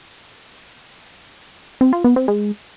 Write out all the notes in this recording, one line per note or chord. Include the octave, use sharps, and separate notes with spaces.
C4
F4
B3
C4
G#3